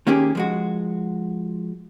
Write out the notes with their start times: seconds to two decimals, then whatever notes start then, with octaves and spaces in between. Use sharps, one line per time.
0.07 D#3 A#3 C#4 G4 G#4
0.35 F3 G#3 F#4